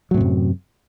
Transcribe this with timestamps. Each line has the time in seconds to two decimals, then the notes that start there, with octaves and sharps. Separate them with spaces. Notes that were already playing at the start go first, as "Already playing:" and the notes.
0.11 F#3
0.14 A2
0.17 C3
0.21 F#2